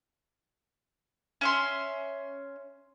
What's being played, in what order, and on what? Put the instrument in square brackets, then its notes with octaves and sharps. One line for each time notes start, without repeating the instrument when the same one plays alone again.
[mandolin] C#4 E5 C6